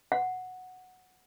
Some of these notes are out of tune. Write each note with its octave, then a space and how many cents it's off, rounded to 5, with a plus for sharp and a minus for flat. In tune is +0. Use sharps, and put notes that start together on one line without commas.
F#5 -5